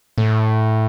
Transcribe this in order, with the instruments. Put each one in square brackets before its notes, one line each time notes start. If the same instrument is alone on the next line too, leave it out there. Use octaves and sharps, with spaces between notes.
[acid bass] A2